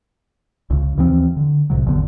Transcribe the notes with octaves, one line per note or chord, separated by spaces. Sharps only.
C#2 C#3
D#2 E3 F3 C4
D3
C2 A2 C3 F#3
G#1 E2 D3 B3